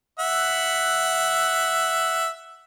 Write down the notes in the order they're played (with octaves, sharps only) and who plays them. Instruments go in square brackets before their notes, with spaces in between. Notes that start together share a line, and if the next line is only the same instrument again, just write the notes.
[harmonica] E5 F#5